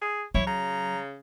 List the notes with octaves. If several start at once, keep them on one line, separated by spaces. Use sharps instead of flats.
G#4
F#3 E4 C#5
C#3 A#5